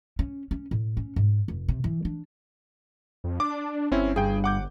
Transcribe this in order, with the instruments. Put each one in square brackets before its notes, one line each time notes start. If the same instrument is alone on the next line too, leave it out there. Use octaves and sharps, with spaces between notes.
[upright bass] C#4
C#4
A2
C#4
G#2
F1
C3
E3
D4
[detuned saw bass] F2
[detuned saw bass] D4 [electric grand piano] D6
[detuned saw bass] G1 [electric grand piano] C4 C#4 E4
[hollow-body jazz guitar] G2 [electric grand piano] G#4 G5
[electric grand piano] F#5 D6 G6